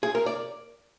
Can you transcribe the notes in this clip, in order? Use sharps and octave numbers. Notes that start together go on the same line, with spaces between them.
G#4
A#4
D5